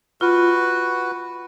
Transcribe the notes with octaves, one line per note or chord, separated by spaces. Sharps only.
F4 F#4 B4